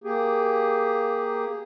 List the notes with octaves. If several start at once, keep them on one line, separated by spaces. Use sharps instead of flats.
A#3 G4 G#4